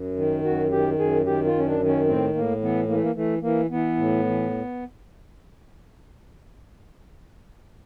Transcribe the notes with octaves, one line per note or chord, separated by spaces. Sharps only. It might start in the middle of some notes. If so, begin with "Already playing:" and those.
Already playing: F#2
D#3
F#2 F#4
D#3 G4
F#2 G#4
D#3 G4
F4
F#2 C#4
D4
D#3
C#4
A2 C4
A2 A#3
E3 B3
E3 A#3
A3
A#3
E3 A3
E3 A#3
E3 B3
A2
E3